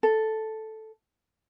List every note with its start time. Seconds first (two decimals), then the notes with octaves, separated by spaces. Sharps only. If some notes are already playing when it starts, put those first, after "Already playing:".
0.03 A4